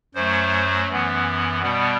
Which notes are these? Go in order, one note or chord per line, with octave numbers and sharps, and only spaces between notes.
F#2 F#3 A3 C5
F#2 E3 B3
B2 G3 B3